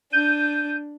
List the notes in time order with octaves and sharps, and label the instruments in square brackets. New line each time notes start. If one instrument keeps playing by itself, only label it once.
[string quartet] D4 [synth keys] G6 D#7